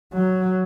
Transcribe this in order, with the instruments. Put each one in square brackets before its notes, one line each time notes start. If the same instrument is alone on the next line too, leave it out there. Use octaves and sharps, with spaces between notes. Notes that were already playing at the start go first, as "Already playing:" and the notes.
[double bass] F#3